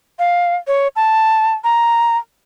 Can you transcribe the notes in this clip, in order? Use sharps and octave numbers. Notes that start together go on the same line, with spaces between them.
F5
C#5
A5
A#5